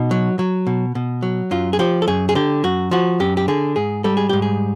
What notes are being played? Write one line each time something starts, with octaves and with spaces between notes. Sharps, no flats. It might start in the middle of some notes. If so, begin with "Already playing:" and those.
Already playing: B2 D#4
F#3
F#3
B2
B2
F#3
F#2 F4
G#4
F3 G4
A4
F#2 G#4
G#4
D3 G4
F#2 F#4
F3 F#4
F#2 G4
G4
D3 G#4
G#2 G#4
G3 A4
G#4
G#2 G4
G#4